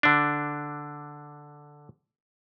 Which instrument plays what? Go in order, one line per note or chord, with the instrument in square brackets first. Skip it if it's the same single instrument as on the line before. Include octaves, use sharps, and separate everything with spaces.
[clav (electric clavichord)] D3 D4